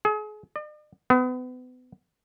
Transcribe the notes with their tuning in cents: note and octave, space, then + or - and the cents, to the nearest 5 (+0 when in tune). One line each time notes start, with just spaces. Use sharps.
G#4 +35
D5 +45
B3 +35